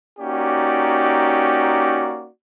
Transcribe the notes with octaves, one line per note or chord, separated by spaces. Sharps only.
A#3 C#4 D#4 F#4 G4 D5